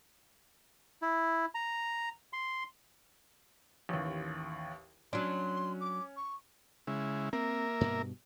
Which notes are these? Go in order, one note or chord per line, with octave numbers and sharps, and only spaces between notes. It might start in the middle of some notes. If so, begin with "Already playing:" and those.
E4
A#5
C6
A1 D#2
F#3 C#4 D4 C6
D6
C#6
C#3 G#3 E4
A#3 C4 A#4 E5
G2 B2